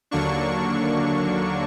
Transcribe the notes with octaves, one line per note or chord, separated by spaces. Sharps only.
D#2 D3 F#3 A#3 D4 C#6